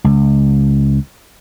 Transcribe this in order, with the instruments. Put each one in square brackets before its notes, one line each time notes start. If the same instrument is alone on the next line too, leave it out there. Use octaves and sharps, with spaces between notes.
[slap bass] C#2